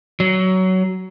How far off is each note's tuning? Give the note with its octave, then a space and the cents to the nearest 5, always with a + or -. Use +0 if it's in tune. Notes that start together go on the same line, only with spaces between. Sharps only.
F#3 +15